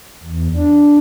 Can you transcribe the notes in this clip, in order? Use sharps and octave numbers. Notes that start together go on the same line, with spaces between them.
E2
D4